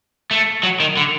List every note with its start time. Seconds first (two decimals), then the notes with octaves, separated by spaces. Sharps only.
0.31 A3
0.63 F#3
0.80 D#3
0.97 D3